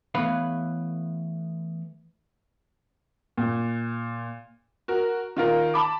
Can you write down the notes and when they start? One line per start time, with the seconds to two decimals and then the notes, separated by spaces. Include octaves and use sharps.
0.15 E3 A3 B3 B4 C#5 F5
3.38 A#2
4.88 F#4 A#4
5.37 D#3 F4 A#4
5.74 A5 B5 D6